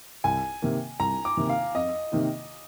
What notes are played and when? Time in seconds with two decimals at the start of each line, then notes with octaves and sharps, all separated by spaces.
0.24 C2 G#5
0.62 C3 D#3 A#3
1.00 C2 A#5
1.25 D6
1.37 C3 D#3 A#3
1.49 F5
1.74 F2 D#5
2.12 C3 D#3 A#3 D#4